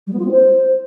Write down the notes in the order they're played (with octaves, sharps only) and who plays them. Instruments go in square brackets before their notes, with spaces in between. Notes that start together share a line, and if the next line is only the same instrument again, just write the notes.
[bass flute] G3
B3
F4
C4
C5